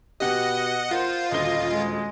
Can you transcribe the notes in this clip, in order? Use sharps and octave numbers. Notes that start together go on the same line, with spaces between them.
B2 B3 G4 D#5 F#5
F4 A#4 C5 F#5
D#1 D2 D#5 G7
G#3